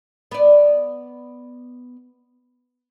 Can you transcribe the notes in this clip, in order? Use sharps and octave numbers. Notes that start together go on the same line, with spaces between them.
B3 D5